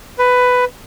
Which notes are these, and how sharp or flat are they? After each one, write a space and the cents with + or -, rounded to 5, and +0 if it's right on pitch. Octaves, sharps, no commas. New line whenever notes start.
B4 +10